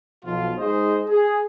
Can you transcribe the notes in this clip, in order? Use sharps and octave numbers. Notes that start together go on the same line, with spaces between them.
B1 B2 F3 F4
G#3 D#4 G#4 C5 D#5
G#4